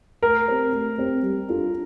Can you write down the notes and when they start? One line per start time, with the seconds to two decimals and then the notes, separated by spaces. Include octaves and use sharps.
0.23 A3 A#4
0.48 C4 G4 C5
0.73 A3
0.98 C4 G4 C5
1.23 G3
1.48 D4 F4 A4